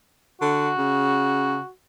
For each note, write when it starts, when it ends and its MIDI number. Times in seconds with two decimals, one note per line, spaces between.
0.41 0.72 50
0.41 1.70 66
0.78 1.60 49